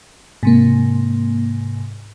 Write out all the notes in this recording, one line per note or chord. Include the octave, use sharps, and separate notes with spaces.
G#2 C3 A#3